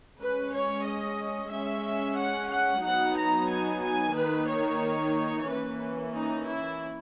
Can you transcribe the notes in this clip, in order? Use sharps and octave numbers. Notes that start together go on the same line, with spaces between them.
G#3 C#4 B4
C#5
D#5
G#3 C#4 E5
F#5
F#5
F#3 B3 D#4 F#5
A#5
G#5
G#5
D#3 A#3 D#4 B4
C#5
E3 A#3 C#4 B4
D#4
E4